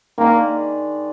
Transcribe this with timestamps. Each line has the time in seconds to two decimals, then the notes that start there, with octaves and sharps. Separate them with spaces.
0.18 D#3 G#3 A#3 D4